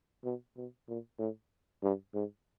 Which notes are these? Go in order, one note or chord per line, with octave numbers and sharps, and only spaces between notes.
B2
B2
A#2
A2
G2
G#2